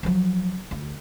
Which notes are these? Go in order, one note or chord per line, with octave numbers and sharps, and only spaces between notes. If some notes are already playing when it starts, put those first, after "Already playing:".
F3 F#3
D2